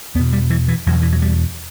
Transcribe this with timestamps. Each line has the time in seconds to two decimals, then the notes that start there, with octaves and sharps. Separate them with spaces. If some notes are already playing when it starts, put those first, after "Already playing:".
0.15 E2 B3
0.20 B2
0.33 G3
0.50 E3
0.68 E3
0.86 E2 B2 F#3
1.02 E3
1.12 F#3
1.22 G3